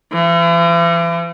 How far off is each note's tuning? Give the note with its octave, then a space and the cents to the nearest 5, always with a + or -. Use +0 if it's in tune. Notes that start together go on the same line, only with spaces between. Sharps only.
E3 +45